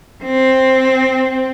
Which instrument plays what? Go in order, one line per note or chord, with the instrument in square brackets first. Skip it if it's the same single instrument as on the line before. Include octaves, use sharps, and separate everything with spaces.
[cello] C4